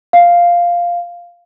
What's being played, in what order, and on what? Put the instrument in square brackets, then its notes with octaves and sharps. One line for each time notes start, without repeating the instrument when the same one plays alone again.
[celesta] F5